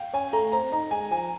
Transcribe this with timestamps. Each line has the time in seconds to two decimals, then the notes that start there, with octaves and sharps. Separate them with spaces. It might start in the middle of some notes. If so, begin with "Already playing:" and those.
Already playing: F5 G5
0.13 C#4 G#5
0.33 A3 A#5
0.52 C4 A#5
0.72 D#4 A#5
0.91 G#3 G#5
1.11 F3 G#5